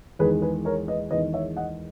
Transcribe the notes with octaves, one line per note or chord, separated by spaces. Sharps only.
E2 D#3 G#3 G#4 B4
G#4 B4
A#4 C#5
B4 D#5
E2 D#3 G#3 B4 D#5
C#5 E5
D#5 F#5